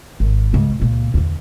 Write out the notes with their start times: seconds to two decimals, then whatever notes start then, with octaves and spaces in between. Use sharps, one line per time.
0.20 G#1
0.53 C#2 G2
0.80 C#2 A#2
1.14 E2 D3